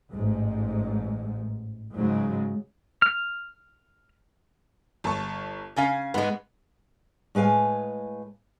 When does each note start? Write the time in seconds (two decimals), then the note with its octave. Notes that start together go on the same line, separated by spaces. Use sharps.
0.11 A1 G#2
1.95 G#2 C#3 F#3 G#3
3.02 F6
5.04 G1 A5 C#6
5.76 C#3 C#4 F5 G#5
6.14 G#2 G#3 B3
7.35 A2 G#3 B4 F5 G#5